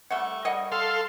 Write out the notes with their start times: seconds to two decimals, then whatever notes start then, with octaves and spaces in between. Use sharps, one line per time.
0.11 G3 A3 F#5
0.45 G3 D#5 F#5
0.72 A4 F5 C6